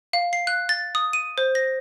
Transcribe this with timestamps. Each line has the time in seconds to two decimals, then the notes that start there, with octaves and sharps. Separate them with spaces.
0.13 F5
0.33 C7
0.47 F#6
0.69 A6
0.95 D#6
1.13 D#7
1.38 C5
1.55 A#6